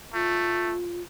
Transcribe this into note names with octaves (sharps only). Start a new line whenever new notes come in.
A3 F4